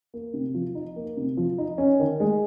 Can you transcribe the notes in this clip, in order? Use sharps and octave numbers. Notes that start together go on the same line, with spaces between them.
A#3
C3
F3
D#4
A#3
C3
F3
D#4
C#4
D#3
G#3